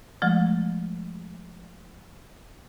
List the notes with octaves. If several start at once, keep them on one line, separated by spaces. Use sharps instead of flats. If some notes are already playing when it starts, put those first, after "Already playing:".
F3 G#3 A3